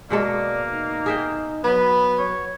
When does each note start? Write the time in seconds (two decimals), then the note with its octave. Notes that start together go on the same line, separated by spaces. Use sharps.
0.10 B2 G#3 A#3 A4 D5
0.68 D#4
1.06 G#4 E5 G5
1.64 F#3 B3 B4
2.19 C#5